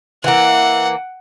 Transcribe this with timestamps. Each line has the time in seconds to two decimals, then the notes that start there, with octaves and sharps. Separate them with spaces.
0.24 E3 A#3 F#5